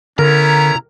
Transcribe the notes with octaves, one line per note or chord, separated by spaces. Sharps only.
D3 B3 C#4 E4 A#4 A#5